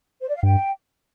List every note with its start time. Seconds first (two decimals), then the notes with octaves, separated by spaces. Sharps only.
0.21 C5
0.28 D5
0.35 F5
0.43 G2 G5